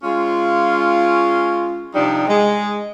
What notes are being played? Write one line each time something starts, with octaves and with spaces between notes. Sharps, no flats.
G#3 C#4 F4
C3 F3 G3 D4 D#4
G#3